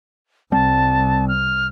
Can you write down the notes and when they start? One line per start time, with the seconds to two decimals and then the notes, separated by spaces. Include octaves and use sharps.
0.52 C2 G3 C4 A5
1.28 F6